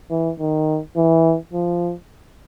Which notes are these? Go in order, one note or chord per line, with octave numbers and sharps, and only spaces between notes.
E3
D#3
E3
F3